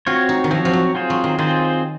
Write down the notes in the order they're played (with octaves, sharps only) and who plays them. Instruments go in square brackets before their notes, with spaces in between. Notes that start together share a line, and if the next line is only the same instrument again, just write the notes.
[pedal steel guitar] C4 F#4 C#5 [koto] F4
[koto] D#4
D#3
[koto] F3 [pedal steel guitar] C4 F#4 C#5
[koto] F3
F#3
[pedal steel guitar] C4 F4 G#4 C5
[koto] F#3
D#3
[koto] D#3 [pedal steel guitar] C4 F4 G#4 C5